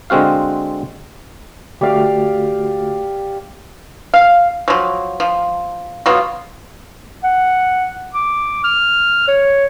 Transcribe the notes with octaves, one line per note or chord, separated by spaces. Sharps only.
D3 G#3 C4 F#4 F5
D3 A3 F#4 G4 D5 F5
F5
F3 F#3
F3
B2 F#3 B3 F4
F#5
D6
F6
C#5